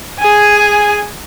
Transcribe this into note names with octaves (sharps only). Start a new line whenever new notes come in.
G#4 G#5